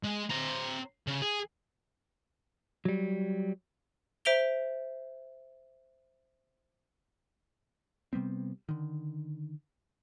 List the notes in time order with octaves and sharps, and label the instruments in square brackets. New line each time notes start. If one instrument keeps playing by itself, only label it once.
[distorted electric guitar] G#3
C4 A#5
C#3
G#4
[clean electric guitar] F#3 G3
[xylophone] C5 E5 D7 F7 G7
[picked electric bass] C3 G3 B3 C4
D3 D#3